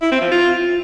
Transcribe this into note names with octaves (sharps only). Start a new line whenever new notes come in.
E4
C4
F3
F4